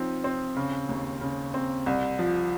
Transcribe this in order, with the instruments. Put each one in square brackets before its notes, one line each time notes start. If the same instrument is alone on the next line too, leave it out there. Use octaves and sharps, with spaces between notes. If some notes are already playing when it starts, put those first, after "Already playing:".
Already playing: [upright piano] F3 C4 D#4
C4
C#3
D#2
C#3
C4
C2
F3